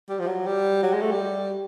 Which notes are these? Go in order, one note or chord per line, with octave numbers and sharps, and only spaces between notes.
G3
F3
F#3
G3
F#3
G#3
A3
G3